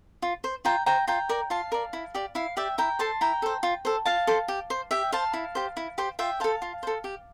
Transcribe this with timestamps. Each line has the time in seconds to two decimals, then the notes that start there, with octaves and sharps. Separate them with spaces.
0.22 F4
0.44 C5
0.65 F4 G5 A#5
0.86 C5 G5 A#5
1.07 F4 G5 A#5
1.29 A#4 D5
1.50 F4 F5 A5
1.72 A#4 D5
1.93 E4
2.15 G4 D5
2.35 E4 F5
2.57 G4 D5 E5 G5
2.78 E4 G5 A#5
2.99 A4 C5 A5 C6
3.21 E4 G5 A#5
3.42 A4 C5
3.63 F4
3.85 A4 C5
4.06 F4 F5 A5
4.27 A4 C5
4.48 G4
4.70 C5
4.91 G4 E5 G5
5.12 C5 F5 A5
5.33 E4
5.55 G4 C5
5.77 E4
5.98 G4 C5
6.19 F4 E5 G5
6.40 A4 C5 F5 A5
6.62 F4
6.83 A4 C5
7.04 G4